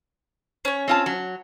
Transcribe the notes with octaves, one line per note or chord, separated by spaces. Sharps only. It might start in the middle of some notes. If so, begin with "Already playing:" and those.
C#4 C#5
C4 F4 A5
F#3